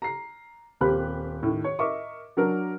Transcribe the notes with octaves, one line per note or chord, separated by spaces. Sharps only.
A#5 C7
D#1 A#3 C4 G4 B5 F#6
A2 D#3
C#5
A#4 D#5 E5 C#6 D6
F#3 D4 A#4